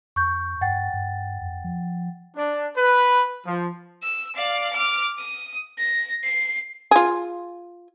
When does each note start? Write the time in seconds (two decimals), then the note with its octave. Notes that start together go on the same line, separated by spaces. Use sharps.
0.16 F2 C#6 G6
0.61 G2 F#5 G5 A6
0.94 G2
1.41 F2
1.64 F3
2.36 D4
2.77 B4
3.46 F3
4.03 E6
4.35 D5 F5
4.73 D6 F6
5.18 D#6
5.78 A#6
6.23 C7
6.91 F4 G#4